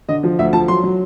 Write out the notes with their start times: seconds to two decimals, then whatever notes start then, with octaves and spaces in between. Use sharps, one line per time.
0.09 D3 D#5
0.23 F3
0.39 D2 E5
0.53 F3 A5
0.68 F#3 C6
0.83 F#3